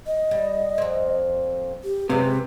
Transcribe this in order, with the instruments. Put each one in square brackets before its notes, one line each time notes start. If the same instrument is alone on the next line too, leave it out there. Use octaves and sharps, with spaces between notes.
[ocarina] D#5
[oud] G3
F2 C4
[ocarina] G4
[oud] F#2 G#3 F4 [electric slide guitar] C3 [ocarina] B4